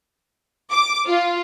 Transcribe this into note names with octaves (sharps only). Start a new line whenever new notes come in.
D6
F4